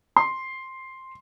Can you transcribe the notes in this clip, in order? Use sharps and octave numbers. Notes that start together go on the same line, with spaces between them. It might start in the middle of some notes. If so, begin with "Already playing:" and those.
C6